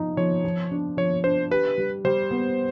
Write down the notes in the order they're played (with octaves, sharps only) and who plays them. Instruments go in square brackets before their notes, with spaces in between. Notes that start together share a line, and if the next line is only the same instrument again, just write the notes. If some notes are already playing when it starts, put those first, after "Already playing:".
Already playing: [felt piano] F3 D#4
[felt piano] F3 [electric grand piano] C#5
[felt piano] F3
D4
[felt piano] F3 [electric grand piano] C#5
[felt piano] D4 [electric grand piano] C5
[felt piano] G4 [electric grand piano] B4
[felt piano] G3
[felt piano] G3 [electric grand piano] C5
[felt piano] B3